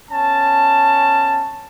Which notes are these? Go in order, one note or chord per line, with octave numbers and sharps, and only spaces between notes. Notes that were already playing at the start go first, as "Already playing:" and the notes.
B3 C#4 A5